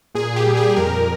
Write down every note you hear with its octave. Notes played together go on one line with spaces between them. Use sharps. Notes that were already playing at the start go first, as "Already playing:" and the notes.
A#2 G#4
G4
G3
G#4
G#4
F2 A#4